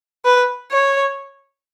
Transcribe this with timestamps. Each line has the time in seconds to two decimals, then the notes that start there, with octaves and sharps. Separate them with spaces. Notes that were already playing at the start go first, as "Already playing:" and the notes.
0.25 B4
0.72 C#5